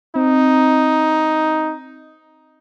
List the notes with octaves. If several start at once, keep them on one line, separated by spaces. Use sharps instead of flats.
C4 D#4